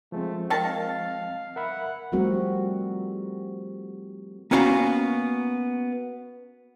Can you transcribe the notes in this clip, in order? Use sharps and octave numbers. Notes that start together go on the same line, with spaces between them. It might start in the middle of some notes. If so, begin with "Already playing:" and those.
F3 G#3 A3 C4
D#3 F5 A5
A#4 E5 F#5 B5
F3 G3 A3 C4 F#4 A#4
A#3 B3 C#4 F#4 F5 A#5